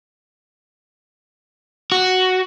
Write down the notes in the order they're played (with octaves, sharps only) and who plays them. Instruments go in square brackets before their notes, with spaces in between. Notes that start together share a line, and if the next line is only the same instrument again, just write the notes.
[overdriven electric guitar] F#4